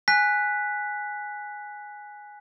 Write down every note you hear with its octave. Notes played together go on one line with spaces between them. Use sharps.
G#5 F#6 B6